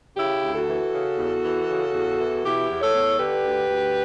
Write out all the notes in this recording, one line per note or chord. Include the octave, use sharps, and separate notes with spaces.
C#3 E4 G4
D2
F#4 A4
E3
C#3
E2
E3
C#3
E2
E3
B2 E4 G4
E2
A4 C#5
E2
D3 G4 B4
D2
D2